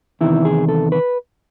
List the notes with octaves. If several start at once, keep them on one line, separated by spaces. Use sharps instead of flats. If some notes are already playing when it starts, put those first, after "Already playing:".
E2 C3 D#3 E4
G#4
A4
B4